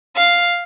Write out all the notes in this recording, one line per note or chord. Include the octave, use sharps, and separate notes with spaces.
F5